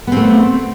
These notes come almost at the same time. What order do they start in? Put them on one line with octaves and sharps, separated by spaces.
B3 C4 A3